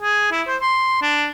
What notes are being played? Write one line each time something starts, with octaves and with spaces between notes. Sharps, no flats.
G#4
E4
C5
C6
D4